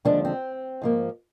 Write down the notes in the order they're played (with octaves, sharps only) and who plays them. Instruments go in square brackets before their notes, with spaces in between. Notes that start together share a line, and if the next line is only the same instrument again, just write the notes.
[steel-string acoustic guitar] D#2 D3 F3 G#3 A#3 D4
C4
G#2 F3 A#3